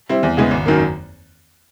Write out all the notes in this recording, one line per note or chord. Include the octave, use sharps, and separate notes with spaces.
G3 C4 E4
E2
C#3 E3 G#3 B3
G#1
F#2 D#3 F#3 A#3